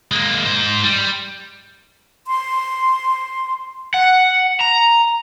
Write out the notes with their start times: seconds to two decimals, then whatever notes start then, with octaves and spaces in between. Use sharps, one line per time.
0.12 G#3 A#3
0.45 G#2 C5
0.84 G3
2.27 C6
3.94 F#5
4.60 A#5